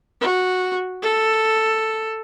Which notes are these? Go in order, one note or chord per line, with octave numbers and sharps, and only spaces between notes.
F#4
A4